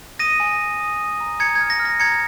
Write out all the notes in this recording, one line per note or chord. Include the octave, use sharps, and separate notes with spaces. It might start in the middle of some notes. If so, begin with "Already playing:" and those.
D#6 A#6 D#7
G#5
D#6
D#6
D#6
A#5
A#5 G#6 C#7
G#6
F6
A#6
F6
A#6
A#5 G#6 C#7